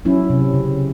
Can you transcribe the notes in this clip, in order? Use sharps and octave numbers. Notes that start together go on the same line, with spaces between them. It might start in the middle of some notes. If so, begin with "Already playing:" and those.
F#3 C#4 E4
C3
C#3